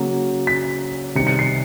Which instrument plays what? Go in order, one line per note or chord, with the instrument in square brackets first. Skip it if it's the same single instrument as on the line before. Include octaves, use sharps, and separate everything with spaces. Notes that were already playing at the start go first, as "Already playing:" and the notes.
Already playing: [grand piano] C#3 F#3 A#3
B6
C3 D#3 G3 C#7
C#7
C7